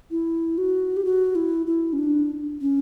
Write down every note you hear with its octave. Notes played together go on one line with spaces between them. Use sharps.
E4
F#4
G4
F#4
E4
E4
C#4
D4
C#4